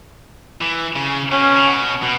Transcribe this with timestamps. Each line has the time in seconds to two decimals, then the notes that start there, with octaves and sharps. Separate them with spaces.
0.61 E3
0.96 C#3
1.31 B2 C#4
1.56 C#3
1.67 B2
2.03 B2